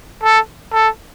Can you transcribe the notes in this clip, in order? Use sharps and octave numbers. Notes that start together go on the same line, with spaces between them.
A4
A4